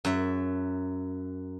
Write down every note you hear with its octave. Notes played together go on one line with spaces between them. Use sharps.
F#2 E5